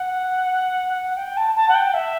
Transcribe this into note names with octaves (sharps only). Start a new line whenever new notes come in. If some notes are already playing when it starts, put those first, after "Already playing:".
Already playing: F#5
G5
A5
A5
F#5
G5
E5